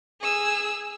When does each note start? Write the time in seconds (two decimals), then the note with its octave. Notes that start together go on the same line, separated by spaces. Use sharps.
0.21 G#4 E6